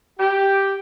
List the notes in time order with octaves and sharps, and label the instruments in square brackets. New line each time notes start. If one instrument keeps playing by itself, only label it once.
[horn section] G4